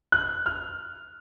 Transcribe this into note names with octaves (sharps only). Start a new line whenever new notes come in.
F#6
F6